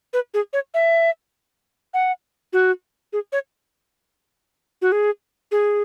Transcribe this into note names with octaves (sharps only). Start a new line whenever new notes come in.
B4
G#4
C#5
E5
F#5
F#4
G#4
C#5
F#4
G#4
G#4